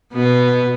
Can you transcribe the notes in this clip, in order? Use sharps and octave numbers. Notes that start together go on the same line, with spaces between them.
B2 B3